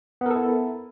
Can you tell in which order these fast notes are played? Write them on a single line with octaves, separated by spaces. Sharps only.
B3 A#4 A4 E4